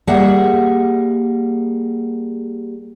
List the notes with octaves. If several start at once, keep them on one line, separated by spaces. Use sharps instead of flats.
G3 A#3 G#4 E5 F#5